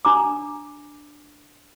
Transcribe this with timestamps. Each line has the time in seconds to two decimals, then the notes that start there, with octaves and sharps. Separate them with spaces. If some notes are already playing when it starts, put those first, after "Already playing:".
0.05 D4 A#5 D6